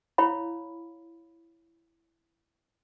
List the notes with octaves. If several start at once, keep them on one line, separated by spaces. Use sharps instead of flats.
E4 C#5 F5 B5